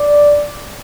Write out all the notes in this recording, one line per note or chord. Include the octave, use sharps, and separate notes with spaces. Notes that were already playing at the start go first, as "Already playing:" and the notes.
Already playing: D5